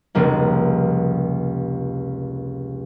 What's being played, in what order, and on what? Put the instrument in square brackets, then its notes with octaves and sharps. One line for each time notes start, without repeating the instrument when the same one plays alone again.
[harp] F1 C#2 G3 A#3